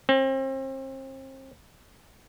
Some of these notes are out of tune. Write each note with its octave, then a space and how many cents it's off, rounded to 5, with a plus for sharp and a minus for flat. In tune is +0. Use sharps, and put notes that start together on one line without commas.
C4 +35